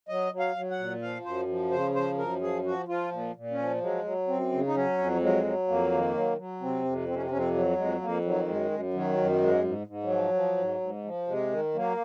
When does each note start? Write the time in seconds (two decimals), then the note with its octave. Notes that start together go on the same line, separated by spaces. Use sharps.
0.09 F#3 D#5
0.32 F#3
0.40 F5
0.56 F#3
0.71 F#5
0.79 A#2
1.02 F3 F5
1.24 F#2 C5
1.48 F3
1.71 C#3 C5
1.95 F3 C5
2.18 F#2 A#4
2.42 F3 G#4
2.64 F3 F#4
2.88 F3 F4
3.11 A#2
3.35 A#2
3.51 C#4
3.59 F3
3.81 F#3 G#3
4.04 F#3
4.28 F#2 C4
4.52 C#3
4.67 D#4
4.75 F#3 C#4
4.98 F2
5.21 F#3 G#3
5.45 F#3
5.68 F2 A#3
5.92 D#3
6.14 F#3
6.37 F#3
6.61 C3 C4
6.85 F2
7.08 C3 C4
7.15 C#4
7.23 C4
7.30 F2 C#4
7.37 C4
7.54 F#3
7.77 F2 G#3
8.01 F2 A#3
8.24 D#3 F#3
8.48 F#2 G#3
8.71 F#2
8.94 D#3 F#3
9.17 F#2
9.41 G#2 G#3
9.64 G#2
9.87 G#2
10.03 F#3
10.10 F3
10.34 F3
10.57 G#2
10.81 G#2
11.04 F3
11.27 C3 G#3
11.51 D#3
11.74 F#3 A#3